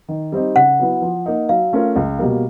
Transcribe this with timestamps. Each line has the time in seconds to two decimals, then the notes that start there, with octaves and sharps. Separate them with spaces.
0.08 D#3
0.32 G3 C4 D#4
0.55 C#3 F#5
0.79 F#3 B3 E4
1.02 F3
1.26 A#3 D#4
1.49 F#3 F5
1.73 A3 C#4 F4 A#4
1.96 C#2
2.19 B2 G3 A#3